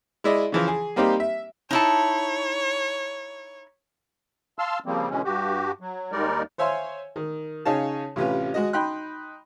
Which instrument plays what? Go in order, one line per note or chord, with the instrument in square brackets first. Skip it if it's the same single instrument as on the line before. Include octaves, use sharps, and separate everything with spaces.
[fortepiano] G#3 E4 D5 D#5
C#3 E3 F3
G#4
G3 A#3 C4 D#4 G4
E5
[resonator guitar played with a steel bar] D#4 E4 A5 [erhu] C#5
[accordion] F5 A5 C6 E6 F6
C#3 F3 G3 A#3 C4
B2 D3 E3 G#3 C#4
G2 F#4 G4
F#3
D#2 G3 G#3 D#4 A#4 D5
[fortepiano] C5 C#5 E5 F5 G#5 C6
D#3
C#3 D#4 G#4 C#5 F5 A5
A1 C3 C#4 F4 B4
G#3 F#4 D#5
D#4 G5 B5 C6 F#6